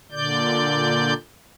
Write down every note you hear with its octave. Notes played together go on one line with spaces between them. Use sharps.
A#2 D3 D5 G6